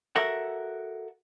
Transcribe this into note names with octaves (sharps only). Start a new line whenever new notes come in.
F#4 A4 A#4 E5 F#5